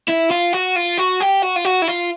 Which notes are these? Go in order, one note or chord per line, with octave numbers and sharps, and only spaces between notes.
E4
F4
F#4
F4
F#4
G4
F#4
F4
F#4
E4
F4